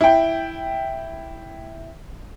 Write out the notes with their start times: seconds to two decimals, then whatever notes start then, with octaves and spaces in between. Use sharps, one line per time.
0.01 E4 G5